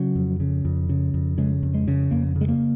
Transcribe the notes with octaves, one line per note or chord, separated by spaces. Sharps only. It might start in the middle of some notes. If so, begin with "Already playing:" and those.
Already playing: C#3 F#3
F2
C#3
F2
C#3
F2
C#3 G#3
F2
G#3
C#3
F2 A#3
C#3
G#3
A#3